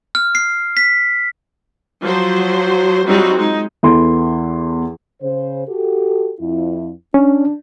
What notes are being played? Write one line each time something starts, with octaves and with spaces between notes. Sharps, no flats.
F6
C7
B6
F3 F#3 C5
F#3 G3 C4 D#4 F4 F#4
G#3 D#4
E2 E3 A4 C6
C#3 C5
F#4 G4 A4
F2 E4
C#4 D4